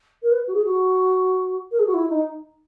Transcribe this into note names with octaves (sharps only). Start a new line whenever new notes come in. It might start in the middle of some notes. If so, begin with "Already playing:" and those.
A#4
B4
F#4
G#4
F#4
A#4
G#4
F#4
E4
D#4